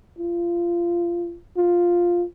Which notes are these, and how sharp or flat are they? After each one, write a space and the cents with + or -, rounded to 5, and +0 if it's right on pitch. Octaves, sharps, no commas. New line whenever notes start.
F4 -20
F4 +5